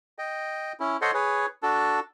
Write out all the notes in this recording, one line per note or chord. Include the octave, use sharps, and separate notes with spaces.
D#5 G5
C#4 E4
A4 C5 C#5 D#5 F#5 C6
G#4 B4 C#5
D4 F#4 A4 A5